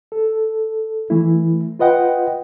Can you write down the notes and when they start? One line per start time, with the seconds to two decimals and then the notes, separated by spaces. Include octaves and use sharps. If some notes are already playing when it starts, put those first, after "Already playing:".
0.12 A4
1.10 E3 A3 E4
1.79 F4 B4 D#5 F#5 G5